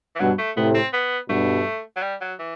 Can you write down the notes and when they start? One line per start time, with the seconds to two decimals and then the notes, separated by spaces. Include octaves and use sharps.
0.16 E3
0.20 G2 B2 F#3
0.38 A3
0.56 A2 C3 B3
0.74 C4
0.93 B3
1.29 G2 B2 A3
1.96 F#3
2.02 G3
2.21 F#3
2.39 E3